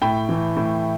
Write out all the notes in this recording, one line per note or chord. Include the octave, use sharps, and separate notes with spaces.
A2 G5 B5
E3 A3
A2